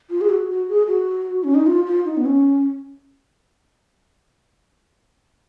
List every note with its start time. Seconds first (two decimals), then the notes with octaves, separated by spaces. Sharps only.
0.10 F4
0.21 G#4
0.30 F#4
0.49 F#4
0.69 G#4
0.88 F#4
1.44 C#4
1.55 D#4
1.66 F4
1.87 F4
2.05 D#4
2.17 B3
2.26 C#4